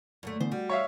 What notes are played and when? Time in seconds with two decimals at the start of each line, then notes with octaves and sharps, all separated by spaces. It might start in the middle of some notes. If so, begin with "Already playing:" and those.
0.23 F#2 D3 A3
0.40 D3 E3 B3 C5
0.52 G3 F#4
0.69 C#5 E5 F5